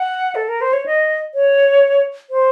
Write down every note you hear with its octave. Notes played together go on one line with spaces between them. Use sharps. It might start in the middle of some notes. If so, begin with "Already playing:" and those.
Already playing: F#5
A4
A#4
C5
C#5
D#5
C#5
C5